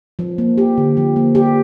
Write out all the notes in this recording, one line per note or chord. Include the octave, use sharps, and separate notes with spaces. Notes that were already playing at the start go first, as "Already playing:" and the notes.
F3
A#3
G4
D3
F3
A#3
G4